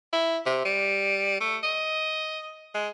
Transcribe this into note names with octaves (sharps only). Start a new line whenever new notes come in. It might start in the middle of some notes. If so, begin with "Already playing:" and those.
E4
C3
G3
A3
D#5
G#3